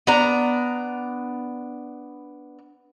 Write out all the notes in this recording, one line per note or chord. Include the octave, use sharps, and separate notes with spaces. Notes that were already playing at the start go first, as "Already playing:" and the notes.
B3 D4 A#5